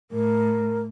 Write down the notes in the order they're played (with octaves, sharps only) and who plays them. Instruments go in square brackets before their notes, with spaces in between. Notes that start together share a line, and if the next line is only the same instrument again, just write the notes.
[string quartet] A2 [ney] A#4